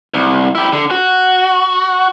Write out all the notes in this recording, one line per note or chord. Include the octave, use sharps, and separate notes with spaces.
C2
E4 G4
D3
F#4